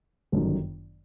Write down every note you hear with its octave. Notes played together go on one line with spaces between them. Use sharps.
G1 F#2 D#3